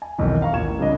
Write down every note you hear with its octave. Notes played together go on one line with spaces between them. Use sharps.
G#5
E1 B1 F2 D#3 E3
F5 A#5 C#6
A1 D#2 F4 C#6 G#6 E7
A2
C2 C#3 F3 D4 D#5